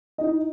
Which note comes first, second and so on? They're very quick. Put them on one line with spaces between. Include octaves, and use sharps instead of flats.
D#5 D#4 E4